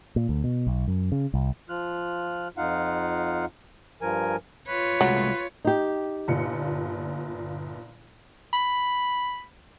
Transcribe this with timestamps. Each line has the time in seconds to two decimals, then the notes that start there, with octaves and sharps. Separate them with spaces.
0.16 A#2
0.29 D2
0.44 B2
0.67 B1
0.88 F#2
1.12 C#3
1.34 C2
1.69 F3 F4 F6 F#6
2.57 F2 D#4 F4 F5 F#5
4.02 G2 F3 A#4 G#5
4.68 F4 B4 C#5
5.01 C2 F#3 G#3 A3
5.65 D#4 G4
6.28 G1 A#2 C#7
8.53 B5